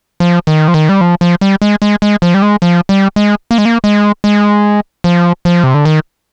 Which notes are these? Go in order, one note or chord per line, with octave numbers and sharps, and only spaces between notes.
F3
D#3
F3
D#3
G3
F3
F3
G3
G#3
G#3
G#3
F3
G3
G#3
F3
G3
G#3
A#3
G#3
A#3
G#3
G#3
F3
F3
C3
D3
D#3